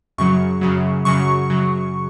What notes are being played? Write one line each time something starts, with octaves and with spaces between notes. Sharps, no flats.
F#2 C#3 F#3 C#6
F#2 C#3 F#3
F#2 C#3 F#3 C#6
C#3 F#3